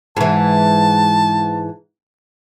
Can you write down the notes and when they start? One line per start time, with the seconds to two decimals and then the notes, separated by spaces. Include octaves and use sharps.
0.17 G#2 E3 A5